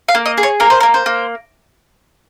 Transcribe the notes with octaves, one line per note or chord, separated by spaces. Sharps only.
F5
A#3
D#5
G#4
C#5
A#3 A#4
C5
A#4
A#3
C5
A#3